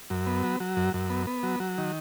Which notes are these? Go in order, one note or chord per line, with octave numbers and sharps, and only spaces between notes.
F#2
B3
F#3
F#3
F#2
F#2
B3
B3
F#3
F#3
D#3